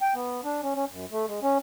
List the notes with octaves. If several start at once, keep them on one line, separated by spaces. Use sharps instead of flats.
G5
B3
D4
C#4
C#4
F#2
A3
G#3
C#4